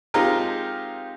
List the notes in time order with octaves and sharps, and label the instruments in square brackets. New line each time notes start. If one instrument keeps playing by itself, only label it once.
[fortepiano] G#3 C4 D#4 F4 G4 A#4